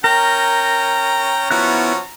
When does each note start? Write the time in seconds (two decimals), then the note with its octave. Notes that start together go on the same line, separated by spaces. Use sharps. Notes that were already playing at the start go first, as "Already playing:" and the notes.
0.04 C#4 A#4 G5 A#5
1.51 F3 B3 C#4 E4 F#4 F#6